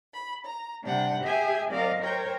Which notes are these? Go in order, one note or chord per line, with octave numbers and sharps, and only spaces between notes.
B5
A#5
C3 G3 D4 F#5 G5
G4 G#4 E5 G5 G#5
F#3 C4 A#4 D5 D#5 F5
A#4 C5 C#5 G5 A#5